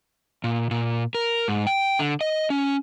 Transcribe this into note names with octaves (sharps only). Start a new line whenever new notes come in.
A#2
A#2
A#4
G#2
G5
D3
D#5
C#4